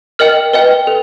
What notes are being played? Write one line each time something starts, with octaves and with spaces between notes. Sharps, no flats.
A#4 D#5 G5 F6
B4 D#5 G5
A4